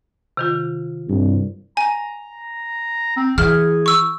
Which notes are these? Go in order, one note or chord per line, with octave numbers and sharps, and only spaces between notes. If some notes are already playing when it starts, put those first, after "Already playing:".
C3 D#3 F4
C2 G2
G#5 A#5
C4
E3 G#4 F6
C#6 E6